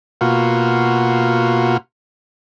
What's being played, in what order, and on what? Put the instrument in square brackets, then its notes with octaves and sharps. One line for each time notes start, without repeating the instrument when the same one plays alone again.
[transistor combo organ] B2 A#3 F4 F#4